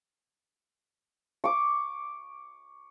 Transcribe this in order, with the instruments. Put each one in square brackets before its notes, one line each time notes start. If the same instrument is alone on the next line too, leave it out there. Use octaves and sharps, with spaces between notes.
[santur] C#6 D6